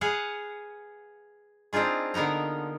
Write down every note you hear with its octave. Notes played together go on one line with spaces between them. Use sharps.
G#4 B4 F5 F#5
C4 D4 D#4 F4 G#4
D3 A#3 B3 D#4 A#5